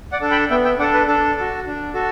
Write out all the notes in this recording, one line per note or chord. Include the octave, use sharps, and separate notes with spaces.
D5 F#5
D4 A4
G5 B5
B3 E5 G5
E5 G5
D4 A4 D5 F#5
B4
D4 A4
F#4 A4
D4
F#4 A4